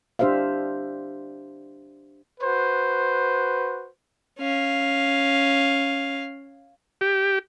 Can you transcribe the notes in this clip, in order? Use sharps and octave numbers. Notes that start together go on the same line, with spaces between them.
D4 G4 C5 E5 F5
F#4 B4 C5
C#4 F5
G4